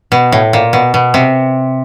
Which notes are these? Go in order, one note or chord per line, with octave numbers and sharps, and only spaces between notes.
B2
A2
A#2
B2
B2
C3